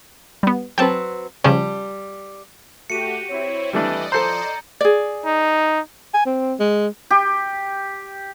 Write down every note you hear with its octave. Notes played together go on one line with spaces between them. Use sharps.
G3 B3
F#3 C4 B4 G5 A5
C#3 F3 G3 C#4 A5
A3 F#4 G4 C#7 D#7
C4 E4 C#5
E3 G3 A3 D4 D5 D#5
F3 A4 C5 A#5 G6 C#7
G#4 D5
D#4
G#5
C4
G#3
G4